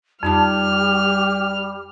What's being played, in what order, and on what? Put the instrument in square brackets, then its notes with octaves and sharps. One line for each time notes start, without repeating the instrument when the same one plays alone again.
[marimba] F2 D#4 A5 [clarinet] G3 [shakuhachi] G4 [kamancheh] F6